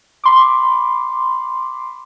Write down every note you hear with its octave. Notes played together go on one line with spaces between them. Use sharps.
B5 C6 D6